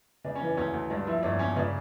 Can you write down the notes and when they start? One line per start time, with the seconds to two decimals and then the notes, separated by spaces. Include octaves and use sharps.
0.24 C#3 D4
0.35 C#4
0.41 E3
0.47 D4
0.57 D2 C#4
0.74 D2
0.90 G2 D4
1.07 F3 E4
1.23 G1 D4
1.39 G1 C#4
1.56 C#3 D4